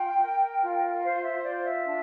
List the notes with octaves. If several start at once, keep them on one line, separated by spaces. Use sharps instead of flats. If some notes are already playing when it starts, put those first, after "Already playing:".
Already playing: F4 G5
A#4
F4
C5 F5
F5
E5
F4 D5
E5
D4